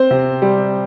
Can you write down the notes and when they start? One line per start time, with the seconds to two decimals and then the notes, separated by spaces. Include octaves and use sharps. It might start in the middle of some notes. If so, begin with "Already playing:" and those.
Already playing: C4 C5
0.11 C3
0.42 G3